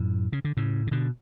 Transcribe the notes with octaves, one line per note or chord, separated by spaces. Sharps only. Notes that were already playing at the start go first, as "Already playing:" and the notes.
Already playing: F#2 A2
C#3
D3
A2 C#3
C#3
B2 D3